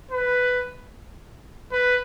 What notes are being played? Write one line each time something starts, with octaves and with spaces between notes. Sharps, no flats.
B4
B4